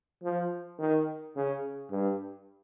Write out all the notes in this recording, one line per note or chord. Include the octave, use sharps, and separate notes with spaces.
F3
D#3
C#3
G2